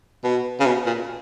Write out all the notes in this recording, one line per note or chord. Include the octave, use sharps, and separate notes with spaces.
B2
C#3
B2
A#2